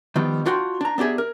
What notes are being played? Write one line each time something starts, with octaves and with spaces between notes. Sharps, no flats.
D#3 F3 G3 B3
D4 F4 F#4 G5 C6
D4 A#5
B3 D4 G4 G#4 E5
A#4